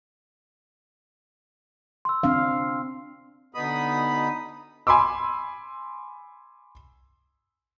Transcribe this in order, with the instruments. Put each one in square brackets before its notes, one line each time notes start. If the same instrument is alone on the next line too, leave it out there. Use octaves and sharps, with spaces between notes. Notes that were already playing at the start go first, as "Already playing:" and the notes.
[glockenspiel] C6 E6
[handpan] C4 D4 F5
[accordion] D2 B2 B3 D#4 B5 D#6
[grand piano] G#5 B5 C6 D6 E6